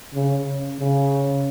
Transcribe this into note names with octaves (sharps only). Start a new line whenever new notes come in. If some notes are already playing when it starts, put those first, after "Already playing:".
C#3
C#3